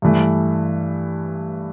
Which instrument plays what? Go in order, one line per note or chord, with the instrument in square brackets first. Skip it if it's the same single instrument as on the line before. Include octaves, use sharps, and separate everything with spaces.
[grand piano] G2 E3 A3